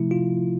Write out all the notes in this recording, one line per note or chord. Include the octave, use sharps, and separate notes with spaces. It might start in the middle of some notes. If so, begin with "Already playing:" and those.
Already playing: C3 F3 A3 E4
F4